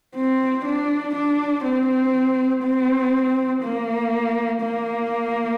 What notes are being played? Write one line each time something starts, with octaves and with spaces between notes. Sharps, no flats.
C4
D4
D4
C4
C4
A#3
A#3